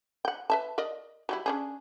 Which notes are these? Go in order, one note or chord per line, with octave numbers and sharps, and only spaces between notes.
F#5 G5
B4 E5 A5
A#4 D5 D#5
F#3 G3 E4
C#4 D4 G#4